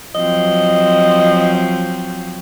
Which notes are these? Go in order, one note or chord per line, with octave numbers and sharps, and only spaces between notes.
F3 F#3 C4 D#5